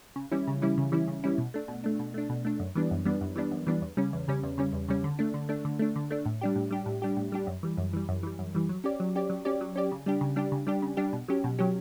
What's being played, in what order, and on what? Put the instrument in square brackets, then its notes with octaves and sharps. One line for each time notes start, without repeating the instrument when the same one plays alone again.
[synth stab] C#3
E3 G3 C#4 E4
C#3
E3 G3 C#4 E4
C#3
E3 G3 C#4 E4
C#3
E3 G3 C#4 E4
B2
A3 D4
B2
A3 D4
B2
A3 D4
B2
A3 D4
F#2
E3 G3 B3 D4
F#2
E3 G3 B3 D4
F#2
E3 G3 B3 D4
F#2
E3 G3 B3 D4
E2
C#3 G3 C#4
E2
C#3 G3 C#4
E2
C#3 G3 C#4
E2
C#3 G3 C#4
D3
A3 D4
D3
A3 D4
D3
A3 D4
D3
A3 D4
A2
G3 D4 G4
A2
G3 D4 G4
A2
G3 D4 G4
A2
G3 D4 G4
F#2
E3 G3
F#2
E3 G3
F#2
E3 G3
F#2
E3 G3
F#3
C#4 G4 D5
F#3
C#4 G4 D5
F#3
C#4 G4 D5
F#3
C#4 G4 D5
C#3
G3 D4 G4
C#3
G3 D4 G4
C#3
G3 D4 G4
C#3
G3 D4 G4
B2
F#3 C#4 G4
B2
F#3 C#4 G4